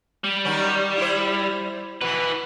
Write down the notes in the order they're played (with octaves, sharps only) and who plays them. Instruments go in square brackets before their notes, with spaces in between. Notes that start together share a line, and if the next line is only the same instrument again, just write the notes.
[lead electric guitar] G3
[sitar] D#3 F#3 C#4
E4 C5
[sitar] B2 [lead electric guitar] E3 B4